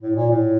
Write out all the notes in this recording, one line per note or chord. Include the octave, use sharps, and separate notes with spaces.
A2
A#2
A2